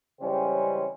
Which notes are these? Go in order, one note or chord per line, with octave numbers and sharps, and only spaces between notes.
C#3 E3 G3 G#3 C4 C#4